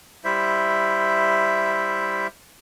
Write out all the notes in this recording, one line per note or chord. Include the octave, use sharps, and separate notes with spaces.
G3 E4 C5 E5